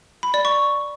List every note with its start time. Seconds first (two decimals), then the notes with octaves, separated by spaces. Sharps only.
0.23 B5
0.34 D5
0.45 C#6